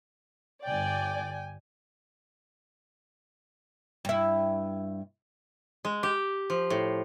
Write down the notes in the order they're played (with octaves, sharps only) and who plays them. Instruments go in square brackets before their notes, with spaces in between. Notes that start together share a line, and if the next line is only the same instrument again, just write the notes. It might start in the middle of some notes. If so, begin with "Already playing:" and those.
[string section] G1 D5 [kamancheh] G5 G#5
[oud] G2 E4
[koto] G#3
G4
F3
A2